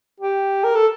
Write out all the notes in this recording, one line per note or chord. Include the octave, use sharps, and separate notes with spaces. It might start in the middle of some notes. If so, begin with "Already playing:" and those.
G4
A#4
A4